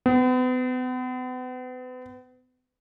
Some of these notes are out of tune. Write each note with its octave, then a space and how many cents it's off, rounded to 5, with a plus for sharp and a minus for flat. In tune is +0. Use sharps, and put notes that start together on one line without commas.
B3 +40